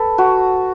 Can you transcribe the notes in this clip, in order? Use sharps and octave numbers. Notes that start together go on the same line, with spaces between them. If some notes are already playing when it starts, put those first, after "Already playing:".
Already playing: A4 B4
F#4